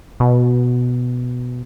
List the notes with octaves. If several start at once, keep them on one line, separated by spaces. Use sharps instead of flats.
B2